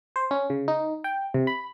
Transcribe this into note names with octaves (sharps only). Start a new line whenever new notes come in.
C5
C#4
C#3
D#4
G5
C3
B5